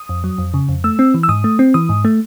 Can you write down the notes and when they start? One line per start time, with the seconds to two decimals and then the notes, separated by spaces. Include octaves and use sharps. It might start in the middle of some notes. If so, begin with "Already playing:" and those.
Already playing: D#6
0.09 F2
0.24 F#3
0.38 F2
0.54 C#3
0.69 F2
0.84 A3 E6
0.99 C4
1.14 E3
1.23 E6
1.29 G#2 D#6
1.44 A3
1.59 C4
1.74 E3 D#6
1.89 G#2
2.05 A3